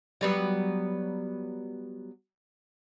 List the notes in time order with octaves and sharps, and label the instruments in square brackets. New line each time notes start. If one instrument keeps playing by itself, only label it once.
[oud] F#3 G3 B3